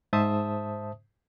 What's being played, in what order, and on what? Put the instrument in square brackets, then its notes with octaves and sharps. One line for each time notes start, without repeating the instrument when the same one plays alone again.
[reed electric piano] G#2 C5 E5 A5 D#6